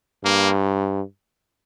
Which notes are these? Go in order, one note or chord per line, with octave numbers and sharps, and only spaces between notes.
G2 A#3